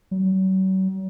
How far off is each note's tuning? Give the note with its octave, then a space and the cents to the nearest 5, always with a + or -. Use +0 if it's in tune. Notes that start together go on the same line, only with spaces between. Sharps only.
F#3 +40